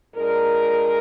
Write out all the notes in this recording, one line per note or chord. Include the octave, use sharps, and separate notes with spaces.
A#2 G#3 D4 A#4